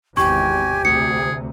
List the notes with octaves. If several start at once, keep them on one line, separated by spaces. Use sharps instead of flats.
G#1 E2 C3 G4 G#5 C#6
D2 C3 G#4 C#7